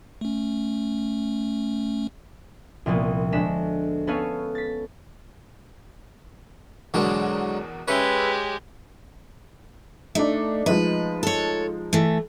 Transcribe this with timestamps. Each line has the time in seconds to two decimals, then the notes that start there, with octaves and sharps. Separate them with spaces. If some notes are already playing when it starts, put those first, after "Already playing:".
0.21 A3 C#4
2.86 C2 A#2 F3 A#3 B3
3.32 D2 G#3 D4 B6 E7
4.07 B3 C#4 A4 B4 C#5 F5
4.55 A6 B6
6.94 E2 B2 D3 F#3 G#3 A#4
7.88 G#3 C#4 G4 G#4 B4 C#5 E5
10.15 A3 D4 D#4
10.66 F3 G#3 D#4 B4
11.23 A4 C#5
11.93 E3 A3